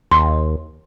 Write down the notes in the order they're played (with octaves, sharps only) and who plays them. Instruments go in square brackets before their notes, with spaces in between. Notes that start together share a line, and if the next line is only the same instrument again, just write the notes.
[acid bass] D#2 [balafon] C6